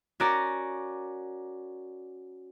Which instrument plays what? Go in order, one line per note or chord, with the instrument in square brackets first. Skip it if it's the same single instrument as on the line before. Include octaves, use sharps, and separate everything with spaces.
[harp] C#4 F#4 A#4 D5 A#5